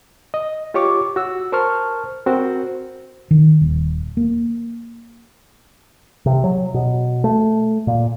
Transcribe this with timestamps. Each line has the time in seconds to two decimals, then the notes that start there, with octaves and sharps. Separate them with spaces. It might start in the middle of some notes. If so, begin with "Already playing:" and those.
0.34 D#5
0.74 F4 G4 C#5 C#6 D6
1.16 F#4 E6
1.52 A#4 C5 A5 C#6 F6
2.26 C4 F#4 A#4 C5
3.31 D#3
3.61 D#1
4.17 A#3
6.26 C3
6.44 F#3
6.74 B2
7.24 A3
7.87 A#2